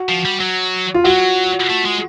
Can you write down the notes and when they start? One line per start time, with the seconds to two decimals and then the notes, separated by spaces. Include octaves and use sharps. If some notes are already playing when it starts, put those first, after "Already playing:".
Already playing: F#4
0.09 F3
0.25 G3
0.40 F#3
0.94 F4
1.04 F#3 F#4
1.69 A3
1.85 G#3